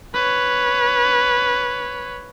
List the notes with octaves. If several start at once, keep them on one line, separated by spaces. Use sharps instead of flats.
B4 C#5